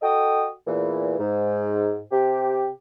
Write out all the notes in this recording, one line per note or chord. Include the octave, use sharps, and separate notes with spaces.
F#4 A4 D#5 G5 D#6
E2 A#2 E3
G#2
C3 G4